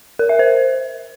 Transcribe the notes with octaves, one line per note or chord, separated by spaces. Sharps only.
A#4
E5
C5